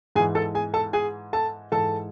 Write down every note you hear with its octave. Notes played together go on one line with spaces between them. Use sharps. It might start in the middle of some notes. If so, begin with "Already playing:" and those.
G#2 E3 G#4 G#5
A4 A5
G#4 G#5
A4 A5
G#4 G#5
A4 A5
G#2 E3 A4 A5